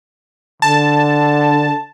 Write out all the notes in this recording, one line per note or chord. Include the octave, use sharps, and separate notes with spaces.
D3 A5